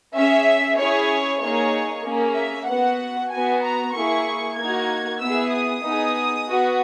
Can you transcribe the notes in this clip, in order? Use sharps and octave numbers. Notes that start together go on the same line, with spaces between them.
C#4 G#4 E5
C#4 E4 G#4 C#5
A#3 D#4 G#4 C#5
A#3 C#4 G#4
E5
B3 F#4 F#5
B3 F#4 G#5
A#5
A#3 E4 G#4 C#6
A#3 D#4 F#4 G#6
B3 E4 G#4 E6
D#6
B3 D#4 G#4
B3 F#4